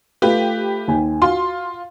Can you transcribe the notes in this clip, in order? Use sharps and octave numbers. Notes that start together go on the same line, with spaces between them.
A3 F4 G4 B4
D#2 G#5
F4 F#4 C6